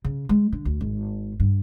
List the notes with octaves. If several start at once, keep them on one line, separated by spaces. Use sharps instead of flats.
C#3
G#3
D3
D2
G#1
G2